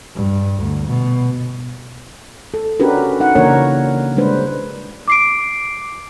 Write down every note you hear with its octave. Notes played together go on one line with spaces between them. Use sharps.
G2
D2
B2
A4
C#4 D4 F#4 G4 A#4 B4
D#4 F#5
C#3 E3 A#3 D4 A#4 C#5
G3 G#3 D4 B4 C5
D6 C7 D7